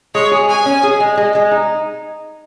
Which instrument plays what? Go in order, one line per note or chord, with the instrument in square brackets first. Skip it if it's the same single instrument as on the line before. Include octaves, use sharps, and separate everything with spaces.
[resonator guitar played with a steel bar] G#3 [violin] C#5
[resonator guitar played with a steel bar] G#4
[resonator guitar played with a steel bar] G#3 [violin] G#5
[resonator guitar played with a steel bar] C#4
G#4
G#3
G#3
G#3
D#4